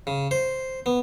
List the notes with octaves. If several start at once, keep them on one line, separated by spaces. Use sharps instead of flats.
C#3
C5
B3